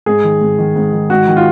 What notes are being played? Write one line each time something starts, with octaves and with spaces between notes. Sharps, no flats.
G#2 G#4
D#3
G#2
D#3
G#2
D#3
G#2 F#4
D#3
F4